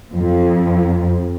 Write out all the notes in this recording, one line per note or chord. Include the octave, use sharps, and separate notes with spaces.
F2